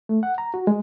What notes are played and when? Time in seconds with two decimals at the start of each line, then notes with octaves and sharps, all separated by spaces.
0.09 A3
0.23 F#5
0.38 A#5
0.54 F#4
0.67 G#3